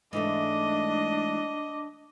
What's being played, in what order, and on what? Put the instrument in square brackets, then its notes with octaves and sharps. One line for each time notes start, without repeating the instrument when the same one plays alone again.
[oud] G#2 E3 A3 [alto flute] D4 [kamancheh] D#5 [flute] D6